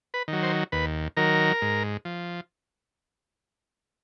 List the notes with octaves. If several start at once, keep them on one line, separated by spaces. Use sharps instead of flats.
B4
D#3
F#3
C5
D#2 B4
D#3 F#3 A#4
G#2
F3